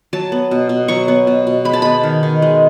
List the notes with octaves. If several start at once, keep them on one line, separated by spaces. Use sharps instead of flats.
F#3 A5
B3
B2
B2
F#3 C#6
B3
B2
B2
G#3 B5
A5
B3 B5
D#3
D#3
G#3